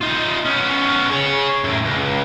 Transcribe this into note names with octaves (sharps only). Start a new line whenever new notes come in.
D#4 F4
B3 C#4
G#4 C#5
F#2 A2
C#2